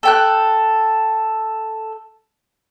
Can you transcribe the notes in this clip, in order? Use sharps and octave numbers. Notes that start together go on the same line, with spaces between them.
A4 G5 F#6